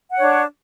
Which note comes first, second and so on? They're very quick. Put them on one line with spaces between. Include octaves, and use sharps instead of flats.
F#5 C#5 D4